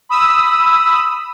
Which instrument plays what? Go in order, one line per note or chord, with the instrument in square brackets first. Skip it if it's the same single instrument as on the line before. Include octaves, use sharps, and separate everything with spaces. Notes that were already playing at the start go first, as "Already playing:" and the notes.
[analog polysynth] B5 D#6 E6